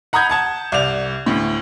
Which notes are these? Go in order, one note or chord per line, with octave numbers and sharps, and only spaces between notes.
F#5 A#5 B5 D#6 G6 G#6
F#5 A5 G#6
C2 D5 F7
D2 A2